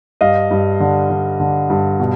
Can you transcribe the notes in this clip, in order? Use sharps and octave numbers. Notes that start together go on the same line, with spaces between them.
G2 D#5 F5
G2
D3
D3
D3
G2
B2